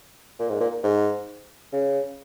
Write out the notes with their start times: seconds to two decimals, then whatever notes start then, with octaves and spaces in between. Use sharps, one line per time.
0.39 A#2
0.49 G#2
0.61 A#2
0.84 G#2
1.73 C#3